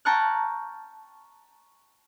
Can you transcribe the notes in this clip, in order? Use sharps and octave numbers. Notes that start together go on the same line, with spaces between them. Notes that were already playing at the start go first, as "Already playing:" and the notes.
G5 A5 A#5 C#6 F6 F#6